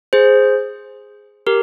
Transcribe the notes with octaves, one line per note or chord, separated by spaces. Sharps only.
G#4 C5
G4 A#4